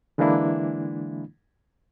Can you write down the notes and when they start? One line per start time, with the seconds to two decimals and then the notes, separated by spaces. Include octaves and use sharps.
0.18 D3 E3 G#3 A#3 D4 E4